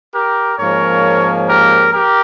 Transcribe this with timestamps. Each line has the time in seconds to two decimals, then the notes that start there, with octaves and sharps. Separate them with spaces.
0.14 G4 A#4
0.58 G#2 F3 A#3 C#4 A#4 C#5
1.47 G4 A#4
1.93 G4 A#4